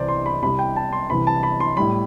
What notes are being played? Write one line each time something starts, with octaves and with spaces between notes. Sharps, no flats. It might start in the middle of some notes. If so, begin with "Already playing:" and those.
Already playing: C2 C3 E3 G3 C5 D5
C6
B5
C2 C3 G3 B5
G5
A5
C6
C2 C3 E3 B5
A5
B5
C6
A2 G3 B5